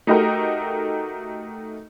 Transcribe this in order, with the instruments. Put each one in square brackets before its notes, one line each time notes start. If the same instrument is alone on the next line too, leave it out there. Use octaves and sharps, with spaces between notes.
[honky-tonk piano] A3 D#4 F#4 G4 A#4